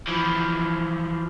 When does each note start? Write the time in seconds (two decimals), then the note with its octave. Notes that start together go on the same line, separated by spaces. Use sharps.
0.09 E3 F3